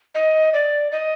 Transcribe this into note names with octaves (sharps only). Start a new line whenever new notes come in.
D#5
D5
D#5